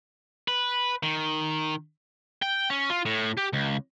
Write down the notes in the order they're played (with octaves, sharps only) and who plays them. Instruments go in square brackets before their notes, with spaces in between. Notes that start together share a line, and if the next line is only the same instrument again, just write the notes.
[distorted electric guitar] B4
D#3
G5
C#4
F4
A2
G4
C#2